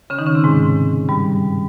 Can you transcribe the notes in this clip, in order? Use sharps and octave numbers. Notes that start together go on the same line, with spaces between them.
C#3 C#4
D#3 D#4
C#3 C#4
C3 C4
G#2 G#3
G2 G3